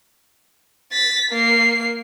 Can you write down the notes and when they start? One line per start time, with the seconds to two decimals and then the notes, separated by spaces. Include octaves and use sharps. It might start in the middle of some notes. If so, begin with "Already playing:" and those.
0.93 A6 B6
1.31 A#3 C7